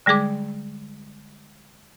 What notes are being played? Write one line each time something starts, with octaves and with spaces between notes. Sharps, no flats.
D3 G3 G#3 G#4 D6